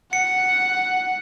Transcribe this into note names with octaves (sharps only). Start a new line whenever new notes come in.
F#5 C#7